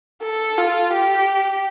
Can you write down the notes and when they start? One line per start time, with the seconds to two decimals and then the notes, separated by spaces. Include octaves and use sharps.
0.23 A4
0.58 F4
0.93 G4